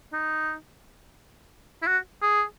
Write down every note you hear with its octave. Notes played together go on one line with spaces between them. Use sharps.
D#4
E4
F#4
G#4